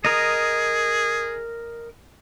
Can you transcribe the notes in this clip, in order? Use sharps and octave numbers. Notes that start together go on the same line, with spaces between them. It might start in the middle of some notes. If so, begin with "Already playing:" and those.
G#4 A#4 D#5